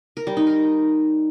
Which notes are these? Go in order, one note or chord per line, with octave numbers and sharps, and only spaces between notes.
A#4
G3
D#4
A#4